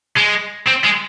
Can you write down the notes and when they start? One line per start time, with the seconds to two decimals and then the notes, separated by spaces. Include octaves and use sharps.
0.17 G#3
0.67 C4
0.84 G#3